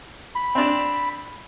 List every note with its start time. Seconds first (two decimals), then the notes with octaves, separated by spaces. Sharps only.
0.35 B5
0.55 C4 D4